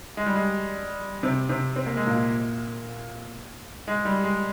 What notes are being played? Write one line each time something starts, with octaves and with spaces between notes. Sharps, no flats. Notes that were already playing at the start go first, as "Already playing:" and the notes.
G#3
G3
G#3
C3 C4
C3 C4
C4
A#3
G#3
A#2 A#3
G#3
G3
G#3